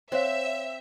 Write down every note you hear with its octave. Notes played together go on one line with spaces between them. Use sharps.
C4 C5 C#5 E5 F5